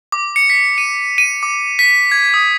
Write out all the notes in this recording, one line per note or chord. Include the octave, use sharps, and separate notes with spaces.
D6
C#7
B6
D#7
D#7
D6
B6
G#6
D#6